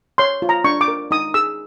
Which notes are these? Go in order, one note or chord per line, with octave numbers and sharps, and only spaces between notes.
C#5 C6
F4
A#5
D4 C#6
D6
A#4
D#4 D#6
G#4 E6